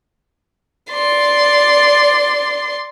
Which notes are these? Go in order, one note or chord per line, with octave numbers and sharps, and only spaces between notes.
D5 C6